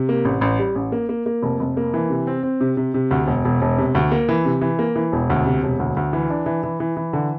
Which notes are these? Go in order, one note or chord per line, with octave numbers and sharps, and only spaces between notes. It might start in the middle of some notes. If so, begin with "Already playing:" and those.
Already playing: C3
A#3
A1
A1
G3
A1
A#3
A#3
A#3
F1
F1
A#3
E3
C3
C4
C4
C3
C3
C3
D2
E1
E1
E1
C3
D2
A#3
E3
C3
E3
A#3
E3
E1
D2
C3
E1
D2
D2
E3
D4
E3
E3
E3
E3
D3